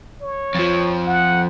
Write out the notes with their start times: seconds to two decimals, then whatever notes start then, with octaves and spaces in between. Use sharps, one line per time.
0.22 C#5
0.55 F2 F3
1.06 F#5